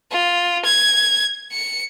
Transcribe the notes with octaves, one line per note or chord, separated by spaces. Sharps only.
F4
G#6
C#7